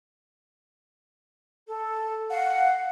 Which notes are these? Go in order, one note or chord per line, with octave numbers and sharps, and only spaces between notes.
A4
F5 F#5